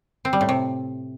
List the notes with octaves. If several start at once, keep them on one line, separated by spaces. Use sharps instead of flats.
C4
G3
A2
C3